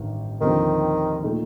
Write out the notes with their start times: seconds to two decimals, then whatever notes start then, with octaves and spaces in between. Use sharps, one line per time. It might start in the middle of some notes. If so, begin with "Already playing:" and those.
Already playing: A1 G2 D#3
0.41 D#2 D3 D#3 F3 C4
1.23 A#2 A3 D#4